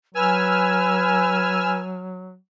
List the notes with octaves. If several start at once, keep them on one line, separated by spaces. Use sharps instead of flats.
F#3 B4 G#5 E6 F6